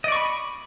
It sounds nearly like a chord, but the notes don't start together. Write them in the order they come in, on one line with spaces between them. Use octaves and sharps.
D#5 D5 C#6 B5